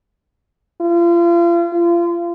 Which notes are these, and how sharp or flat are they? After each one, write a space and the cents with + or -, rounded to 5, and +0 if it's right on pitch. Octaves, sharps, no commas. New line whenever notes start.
F4 -35
F4 -30